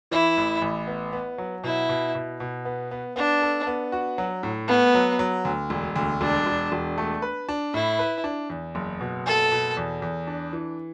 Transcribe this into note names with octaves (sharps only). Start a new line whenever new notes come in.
E3 E4
A1
A1
B3
B3
F#3
B2 E4
B2
B2
B2
B3
B3
B3 D4
A4
B3
F#4
F#3
A2
A3 B3
F#3
F#3
D2
E1
D2
E1 D4
E1
E1
A3
B4
D4
A2 E4
B4
D4
E2
F#1
B2
F#1 A4
B2
E2
E2
D4
E3